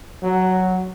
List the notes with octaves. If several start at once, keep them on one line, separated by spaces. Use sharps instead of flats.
F#3